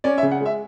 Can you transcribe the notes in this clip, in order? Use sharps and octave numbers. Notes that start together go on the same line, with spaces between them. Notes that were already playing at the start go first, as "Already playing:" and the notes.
C#4 D5
E5
C#3
F#5
G#3 E5